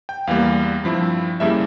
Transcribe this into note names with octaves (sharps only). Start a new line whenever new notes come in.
G5
E2 E3 G3 A#3 F5
G2 F3 C4 E4
F2 C#3 G3 A#3 E4 E5